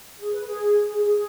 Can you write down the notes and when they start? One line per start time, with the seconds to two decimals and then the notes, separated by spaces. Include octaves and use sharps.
0.18 G#4
0.32 B4
0.46 G#4
0.91 G#4
1.04 G#4